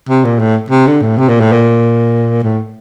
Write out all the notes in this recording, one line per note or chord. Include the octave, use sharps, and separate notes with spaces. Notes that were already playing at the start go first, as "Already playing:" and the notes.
C3
A#2
A2
C3
D3
A2
C3
A#2
A2
A#2
A2